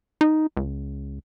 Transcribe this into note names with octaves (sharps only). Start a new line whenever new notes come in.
D#4
C#2